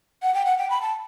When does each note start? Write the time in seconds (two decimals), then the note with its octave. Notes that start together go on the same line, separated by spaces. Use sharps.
0.23 F#5
0.34 G5
0.46 F#5
0.58 G5
0.70 B5
0.82 A5